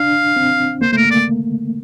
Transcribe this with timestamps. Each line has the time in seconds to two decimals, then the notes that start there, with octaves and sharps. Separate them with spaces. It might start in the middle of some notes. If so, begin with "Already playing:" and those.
Already playing: D4 F5
0.36 C4
0.82 A#3 C5
0.92 A3 A#4 C5
1.05 A#3
1.11 D5